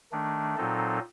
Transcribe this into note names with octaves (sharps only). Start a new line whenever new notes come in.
D#3 A3 D4
A#2 F#3 C4 D#4 A4